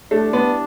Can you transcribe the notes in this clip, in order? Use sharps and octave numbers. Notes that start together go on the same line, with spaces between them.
E3 G3 A3 D4
B3